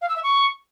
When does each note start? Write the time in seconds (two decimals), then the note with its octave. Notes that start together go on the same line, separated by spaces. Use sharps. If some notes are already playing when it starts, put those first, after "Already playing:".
0.01 F5
0.08 E6
0.16 E5
0.23 C#6